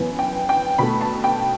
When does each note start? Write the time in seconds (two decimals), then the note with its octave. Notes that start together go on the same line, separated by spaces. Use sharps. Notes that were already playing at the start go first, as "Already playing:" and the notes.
Already playing: F#2 E3 B3
0.19 G5
0.49 G5
0.78 B2 A3 B5
1.01 A5
1.24 G5